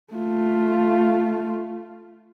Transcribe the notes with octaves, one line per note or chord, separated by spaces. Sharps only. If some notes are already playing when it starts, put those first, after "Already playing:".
A3 F4